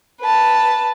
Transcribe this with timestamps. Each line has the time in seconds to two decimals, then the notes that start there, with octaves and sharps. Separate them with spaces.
0.21 B4 A5